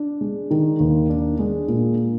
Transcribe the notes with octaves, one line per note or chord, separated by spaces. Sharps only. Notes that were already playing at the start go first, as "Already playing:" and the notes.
Already playing: D4
G#3
D#3
D#2
D4
G#3
A#2